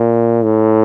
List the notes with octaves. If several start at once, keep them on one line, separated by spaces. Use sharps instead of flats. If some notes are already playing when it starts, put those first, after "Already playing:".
Already playing: A#2
A2